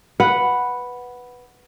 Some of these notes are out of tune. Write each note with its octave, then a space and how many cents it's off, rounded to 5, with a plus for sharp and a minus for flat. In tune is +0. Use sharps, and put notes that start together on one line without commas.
B4 +0 F#5 +0